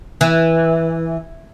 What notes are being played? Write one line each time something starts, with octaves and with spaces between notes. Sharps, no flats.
E3